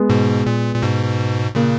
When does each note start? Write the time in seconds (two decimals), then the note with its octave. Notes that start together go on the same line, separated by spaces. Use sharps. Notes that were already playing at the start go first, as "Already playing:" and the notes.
Already playing: G#3 B3
0.09 G#2 B2
0.46 A#2
0.75 A#2
0.82 G#2 B2
1.55 A#2 C#3 A#3